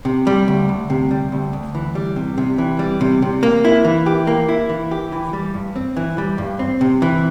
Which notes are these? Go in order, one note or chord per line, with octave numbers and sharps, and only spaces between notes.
C3
G3
D2
D2
C3
G3
D2
D2
E3
G3
C3
C3
E3
G3
C3
C3
A#3
E4
E3
G4
A#3
E4
E3
G4
E3
G3
G2
C4
E3
G3
G2
C4
C3
E3